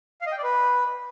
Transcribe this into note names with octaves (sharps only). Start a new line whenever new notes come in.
F5
D#5
G5
D5
B4